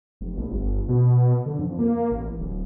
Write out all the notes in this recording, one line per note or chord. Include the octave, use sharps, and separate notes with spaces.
F1
A#1
G1
B2
D3
F2
A#3
A1
D1